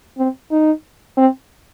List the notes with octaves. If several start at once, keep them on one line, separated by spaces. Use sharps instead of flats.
C4
D#4
C4